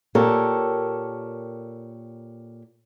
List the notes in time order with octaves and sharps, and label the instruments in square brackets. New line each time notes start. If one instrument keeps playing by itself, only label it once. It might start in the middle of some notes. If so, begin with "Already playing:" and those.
[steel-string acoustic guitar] A#2 G4 A4 A#4 C#5